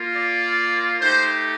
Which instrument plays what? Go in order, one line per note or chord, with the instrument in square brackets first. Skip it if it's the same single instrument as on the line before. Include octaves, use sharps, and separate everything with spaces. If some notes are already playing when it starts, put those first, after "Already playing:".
Already playing: [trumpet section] A#3 F4
D5
A3 D#4 G4 C5